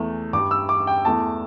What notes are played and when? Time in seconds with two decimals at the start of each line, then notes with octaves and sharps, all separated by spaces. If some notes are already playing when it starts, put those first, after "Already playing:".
Already playing: E2 E3 A3
0.33 G2 G3 D6
0.51 E6
0.69 D6
0.87 G5
1.05 E2 E3 A3 A5